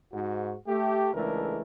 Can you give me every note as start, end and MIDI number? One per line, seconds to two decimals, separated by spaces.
0.13 0.54 44
0.13 0.54 66
0.67 1.13 57
0.67 1.13 67
1.13 1.62 37
1.13 1.62 52
1.13 1.62 56
1.13 1.62 57
1.13 1.62 62
1.13 1.62 70